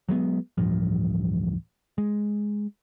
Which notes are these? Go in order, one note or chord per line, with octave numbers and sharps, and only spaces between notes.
F#3 G#3 A3 B3
D1 A1 G2 F3
G#3